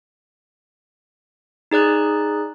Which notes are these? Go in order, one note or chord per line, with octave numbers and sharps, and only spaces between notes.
D#4 G#4 D5 F#6